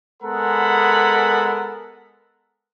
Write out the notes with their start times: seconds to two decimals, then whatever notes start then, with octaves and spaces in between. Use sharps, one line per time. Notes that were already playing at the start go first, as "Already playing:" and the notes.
0.23 G#3 B3 A4 A#4 F#5 B5